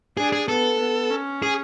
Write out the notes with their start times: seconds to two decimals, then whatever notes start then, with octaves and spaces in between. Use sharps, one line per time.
0.17 D4 G#4
0.32 G#4
0.48 B3 A4
0.79 B3
1.10 C#4
1.42 G#4